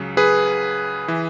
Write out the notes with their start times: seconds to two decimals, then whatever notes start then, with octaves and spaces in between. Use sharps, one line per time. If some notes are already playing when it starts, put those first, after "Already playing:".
Already playing: C#2 C#3 F#3
0.17 G#4 B4
1.08 E3